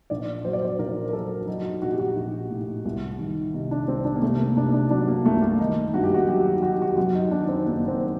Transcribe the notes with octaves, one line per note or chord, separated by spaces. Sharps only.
A#1 D5
F#3 C5
D5
C5
A#1 A#4
A#4
F#3 A4
F#3 D#4
F#4
D#4
A#1 F#4
G4
F#4
A#1
A2
C2
D#3
C3 D#4
D4
C2 C4
D4
A#3
C3 A3
A#3
C3 D4
D4
F#3 D4
A#3
C2 A3
A#3
D#3 D#4
G2 F#4
G4
F#4
F#3 G4
F#3 F#4
G4
F#4
F#2 F#4
D#4
D#3 D4
C4
F#1 A#3
C4